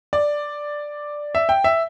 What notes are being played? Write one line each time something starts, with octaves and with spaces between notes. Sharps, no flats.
D5
E5
G5
E5